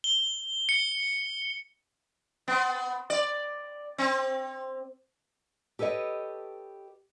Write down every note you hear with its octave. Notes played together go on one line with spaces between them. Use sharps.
G7
C#7
B3
D5
C4
G4 A4 B4 C#5 D#5